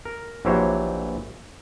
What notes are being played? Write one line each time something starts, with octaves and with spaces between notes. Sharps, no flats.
A#4
A#1 E3 F#3 G4 C5 C#5